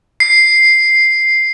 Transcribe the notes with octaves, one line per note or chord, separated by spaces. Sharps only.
C7